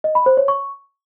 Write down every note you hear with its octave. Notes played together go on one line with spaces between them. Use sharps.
D#5
B5
C5
C#5
C#6